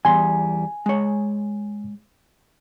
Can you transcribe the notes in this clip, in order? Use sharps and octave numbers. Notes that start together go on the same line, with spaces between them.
E2 G3 G#5 C6
G#3 C#5